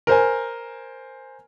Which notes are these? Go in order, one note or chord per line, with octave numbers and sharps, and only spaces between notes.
A#4 C5 G#5